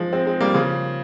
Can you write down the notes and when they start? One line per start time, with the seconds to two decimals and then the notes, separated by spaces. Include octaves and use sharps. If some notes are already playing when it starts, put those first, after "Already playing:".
Already playing: F3 G#3
0.13 G#3 C4
0.27 G#3 C4
0.41 G3 A#3
0.54 C#3 F3